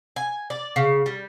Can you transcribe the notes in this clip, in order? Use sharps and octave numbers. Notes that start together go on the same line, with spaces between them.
G#5
D5
C#3
G3